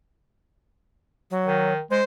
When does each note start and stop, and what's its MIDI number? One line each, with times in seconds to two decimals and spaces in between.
1.31 1.72 54
1.47 1.80 51
1.90 2.02 56
1.90 2.04 72